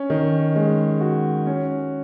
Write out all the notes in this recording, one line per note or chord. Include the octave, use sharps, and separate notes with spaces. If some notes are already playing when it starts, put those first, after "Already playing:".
Already playing: C#4
D#3
G#3
F#4
C#4